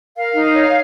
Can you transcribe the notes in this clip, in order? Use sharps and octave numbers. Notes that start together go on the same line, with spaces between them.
A#4 F5
D#4
C#5